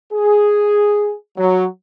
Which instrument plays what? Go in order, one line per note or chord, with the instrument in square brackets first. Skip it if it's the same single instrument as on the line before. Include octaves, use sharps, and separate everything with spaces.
[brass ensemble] G#4
F#3